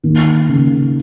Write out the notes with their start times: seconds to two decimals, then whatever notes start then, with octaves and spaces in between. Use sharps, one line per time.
0.03 D#2
0.49 C#3